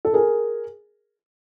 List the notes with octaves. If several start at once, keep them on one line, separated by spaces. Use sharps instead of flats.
A4
G#4 A#4